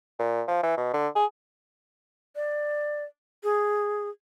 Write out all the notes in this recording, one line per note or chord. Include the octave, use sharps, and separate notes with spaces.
A#2
F3
E3
B2
D3
G#4
D5
G#4